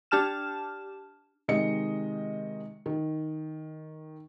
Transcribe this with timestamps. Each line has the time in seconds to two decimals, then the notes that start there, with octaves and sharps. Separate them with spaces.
0.11 D4 G4 A5 F6 E7
1.48 C3 D#3 G#3 D#5 C#7
2.86 D#3